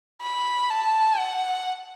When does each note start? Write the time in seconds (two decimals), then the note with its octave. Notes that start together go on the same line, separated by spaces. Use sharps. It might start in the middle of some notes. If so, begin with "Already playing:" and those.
0.22 B5
0.70 A5
1.19 F#5